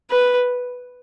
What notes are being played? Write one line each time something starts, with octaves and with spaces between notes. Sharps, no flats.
B4